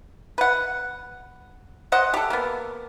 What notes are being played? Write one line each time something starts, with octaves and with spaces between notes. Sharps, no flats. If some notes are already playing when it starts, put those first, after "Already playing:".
B4 F#5
C5 D#5 F#5
G4 A4
A#3 B3